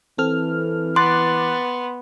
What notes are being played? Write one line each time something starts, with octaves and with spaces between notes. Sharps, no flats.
E3 C4 A4 F6
B3 C6 D6 F#6 A6